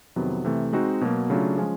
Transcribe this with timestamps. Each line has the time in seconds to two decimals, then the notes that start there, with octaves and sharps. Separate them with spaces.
0.16 F2 C3 D#3 F#3 B3
0.45 C3 E3 A3
0.73 G#3 C4 D#4 F#4
1.01 B2 F#3 A#3
1.30 C#3 F#3 A3 D4 F4
1.58 F3 G#3 C#4